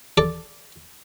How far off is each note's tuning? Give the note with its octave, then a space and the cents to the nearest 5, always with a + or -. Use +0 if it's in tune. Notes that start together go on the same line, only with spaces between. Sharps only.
A4 +0 D5 +0